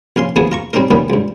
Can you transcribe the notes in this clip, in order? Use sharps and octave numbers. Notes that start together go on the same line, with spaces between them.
A#1 C#4 F5 C6
D#2 F3 A3 B3 G#4 D#6
F4 A#5 C#6
G3 C4 C#4 D#4 A#4
A#2 D#3 G3 B3 C#4 D#4
C#2 G2